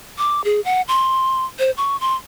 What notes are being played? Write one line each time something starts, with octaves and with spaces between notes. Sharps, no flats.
D6
G#4
F#5
C6
C5
C#6
C6